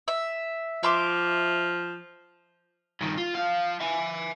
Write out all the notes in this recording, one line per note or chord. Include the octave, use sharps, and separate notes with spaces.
E5
F3 E5 C6 D6
G2 D#3
F4
F3 F5
E5 G#5